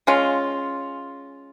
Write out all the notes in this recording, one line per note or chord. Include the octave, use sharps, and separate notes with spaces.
G#3 C#4 F4